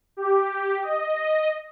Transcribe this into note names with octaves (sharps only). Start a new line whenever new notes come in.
G4
D#5